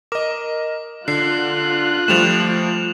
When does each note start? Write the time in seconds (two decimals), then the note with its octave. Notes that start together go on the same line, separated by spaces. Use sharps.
0.12 A#4 D#5 D6
1.08 D3 F4 F#6 C7
2.08 F3 G3 A3 E7 F7